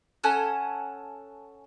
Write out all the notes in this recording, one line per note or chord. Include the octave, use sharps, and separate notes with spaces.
C#4 A4 F#5 G#5